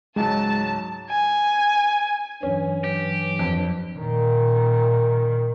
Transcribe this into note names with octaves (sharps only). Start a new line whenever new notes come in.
C#2 G#2 F#3 G#3 A5
G#5
G2 E3 F#3 C#4
G4
F2
A#2 D#3